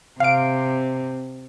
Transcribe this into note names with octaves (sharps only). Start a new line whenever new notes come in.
C3 F5 D7